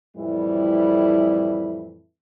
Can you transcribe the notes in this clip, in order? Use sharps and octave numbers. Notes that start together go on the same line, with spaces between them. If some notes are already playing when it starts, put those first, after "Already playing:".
F2 A2 E3 G3 E4